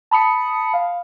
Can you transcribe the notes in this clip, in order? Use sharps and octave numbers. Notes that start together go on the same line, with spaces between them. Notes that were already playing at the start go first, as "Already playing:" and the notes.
A5 B5 D#6 C#7
F5